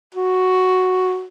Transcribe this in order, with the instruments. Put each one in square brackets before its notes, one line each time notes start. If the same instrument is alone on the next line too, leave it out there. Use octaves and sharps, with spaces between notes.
[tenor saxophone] F#4